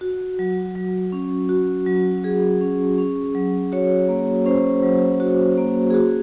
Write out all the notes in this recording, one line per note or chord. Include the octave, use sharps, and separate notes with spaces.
F#4
F#3
F#3
C#4
F#4
F#3
F#3 G#4
C#4
C#4
F#3
F#4 C#5
A#3
C#4 C5
F#3
F#4
A#3
G#4
F#4